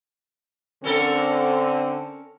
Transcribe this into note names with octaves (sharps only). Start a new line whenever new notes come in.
D3 C4 C#4 A4 A#4